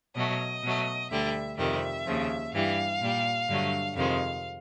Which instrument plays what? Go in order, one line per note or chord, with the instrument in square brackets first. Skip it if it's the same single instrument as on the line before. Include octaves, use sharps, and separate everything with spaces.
[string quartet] B2 F#3 A3 D#5
B2 F#3 A3
D2 D3 G3 E5
F2 C3 D#3 G3 E5
D#2 C#3 F3
G2 E3 G3 F5
A#2 G3
G2 D3 F#3 A3
F2 C3 D#3 G#3 F5